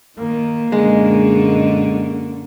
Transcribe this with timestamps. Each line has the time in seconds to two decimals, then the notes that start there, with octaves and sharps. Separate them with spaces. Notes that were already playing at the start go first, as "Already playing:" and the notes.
0.18 D#3 A#3
0.72 F#2 A#2 D3 G#3